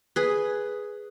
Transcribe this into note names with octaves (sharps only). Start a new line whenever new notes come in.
G#4 B4